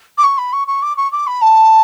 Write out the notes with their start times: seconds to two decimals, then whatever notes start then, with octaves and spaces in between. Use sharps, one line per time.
0.18 D6
0.23 C#6
0.38 B5
0.53 C#6
0.67 C#6
0.82 D6
0.97 C#6
1.12 D6
1.27 B5
1.41 A5